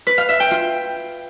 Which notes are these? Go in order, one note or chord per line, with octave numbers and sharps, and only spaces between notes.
B4
F5
E5
G5
F4